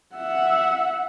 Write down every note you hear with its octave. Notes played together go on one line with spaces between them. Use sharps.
E5 F#5